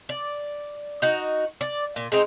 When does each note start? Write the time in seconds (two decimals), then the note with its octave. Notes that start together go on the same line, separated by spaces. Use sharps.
0.09 D5
1.02 D#4 F#4
1.61 D5
1.96 A#2
2.12 G#3 C4 D#4